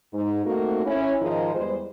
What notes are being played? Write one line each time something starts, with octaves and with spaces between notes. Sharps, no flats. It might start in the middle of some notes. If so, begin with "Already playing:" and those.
G#2
A3 A#3 C4 D#4 F#4
C#4 E4
G#2 D#3 F3 G#3 D#4 F4
E2 G3 G#3 B4 C5